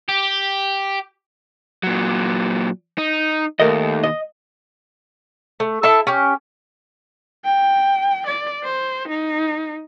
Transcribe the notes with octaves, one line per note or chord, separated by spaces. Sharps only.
G4
A#2 F#3
D#4
D#2 A3 A#4 D#5
D#5
A3
E4 A4 E5 A5
C#4 G4
G5
D5
C5
D#4